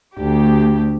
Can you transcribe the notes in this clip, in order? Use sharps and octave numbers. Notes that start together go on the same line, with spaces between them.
D2 G4